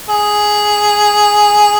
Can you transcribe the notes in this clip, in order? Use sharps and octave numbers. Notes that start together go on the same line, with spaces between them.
G#4